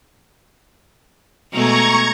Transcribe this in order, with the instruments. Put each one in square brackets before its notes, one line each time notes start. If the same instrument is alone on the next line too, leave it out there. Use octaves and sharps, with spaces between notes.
[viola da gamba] B2 G#3 A3 [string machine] A#5 C#6 G#6